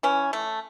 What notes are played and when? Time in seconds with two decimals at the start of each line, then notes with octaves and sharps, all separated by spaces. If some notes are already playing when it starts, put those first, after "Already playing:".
0.03 E3 C#4
0.33 A3